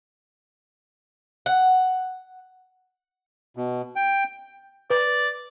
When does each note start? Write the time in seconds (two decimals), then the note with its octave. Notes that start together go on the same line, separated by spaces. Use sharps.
1.46 F#5
3.57 B2
3.96 G5
4.90 B4 D5